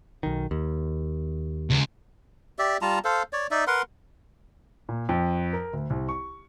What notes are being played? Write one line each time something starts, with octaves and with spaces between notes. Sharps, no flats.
B1 D#3
D#2
C#2
G4 D5 E5
G3 F4 A5 A#5
A4 C5 F5
C#5 D5
D#4 D5 E5
A#4 B4 F#5 C6
A#2
F2
A#4
D2
C2
C#6